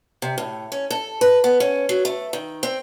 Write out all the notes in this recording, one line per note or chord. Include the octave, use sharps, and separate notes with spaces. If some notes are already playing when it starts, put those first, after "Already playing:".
C3
A2
C#4
A4
B4
B3
C#4
F#3
A3
D#3
C4